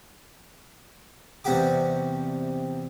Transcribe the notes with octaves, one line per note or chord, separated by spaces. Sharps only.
E2 C3 G3 F#4 G4 D6